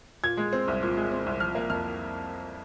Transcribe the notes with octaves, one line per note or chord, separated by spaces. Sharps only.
A#2 G#6
G#3
C4
C2
A#2
G#3
C4
C2
F3 F6
A#3
F2 F6